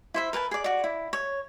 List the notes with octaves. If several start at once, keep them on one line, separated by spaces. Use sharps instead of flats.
E4 C5 E5
A#4 B4 G#5 A5
G#4 D5
F#4 D5
E4
C#5